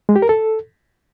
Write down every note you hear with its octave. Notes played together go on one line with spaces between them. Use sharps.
G#3
G4
A#4
A4